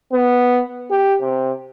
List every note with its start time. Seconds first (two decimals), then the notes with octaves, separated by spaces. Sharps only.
0.13 B3
0.91 G4
1.21 C3